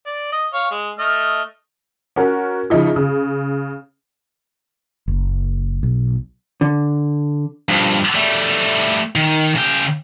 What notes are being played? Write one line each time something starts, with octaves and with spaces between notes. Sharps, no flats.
D5
D#5
C#5 F5
G#3
A3 D#5 F6
C#4 F#4 A#4
C#3 F3 D#4 E4
C#3
F#1
B1
D3
G2 F3
G3 A3
D#3
C#3 G5